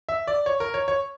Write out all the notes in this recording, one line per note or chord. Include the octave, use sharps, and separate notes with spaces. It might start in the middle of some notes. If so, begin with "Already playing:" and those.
E5
D5
C#5
A#4
C#5
C#5